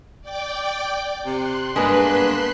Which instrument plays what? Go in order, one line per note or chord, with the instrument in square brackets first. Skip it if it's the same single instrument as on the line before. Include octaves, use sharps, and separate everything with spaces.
[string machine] D5 G5 D6
[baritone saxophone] C3 [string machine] C6 F#6
[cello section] G2 B3 B4 [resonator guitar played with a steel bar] G#3 A#3 [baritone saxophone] D4